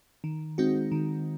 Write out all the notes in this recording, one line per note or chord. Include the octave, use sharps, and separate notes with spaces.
D#3
G#3 C4 D#4 F#4
D#3